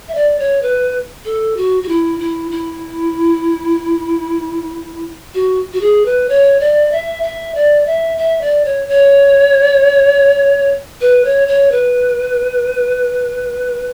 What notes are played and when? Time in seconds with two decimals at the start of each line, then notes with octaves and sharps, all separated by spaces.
0.08 E5
0.15 D5
0.39 C#5
0.62 B4
1.25 A4
1.57 F#4
1.83 F#4
1.89 E4
2.20 E4
2.51 E4
5.35 F#4
5.73 F#4
5.81 G#4
6.06 B4
6.29 C#5
6.60 D5
6.92 E5
7.23 E5
7.55 D5
7.86 E5
8.18 E5
8.41 D5
8.65 C#5
8.88 C#5
11.01 B4
11.25 C#5
11.48 C#5
11.72 B4